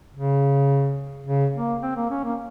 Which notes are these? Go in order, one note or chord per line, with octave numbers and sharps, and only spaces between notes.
C#3
C#3
A#3
C4
A#3
C#4
A#3